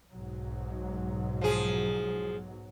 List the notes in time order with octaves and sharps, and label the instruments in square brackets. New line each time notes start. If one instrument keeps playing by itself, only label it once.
[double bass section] B1 G#2 F#3
[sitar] F3 G#4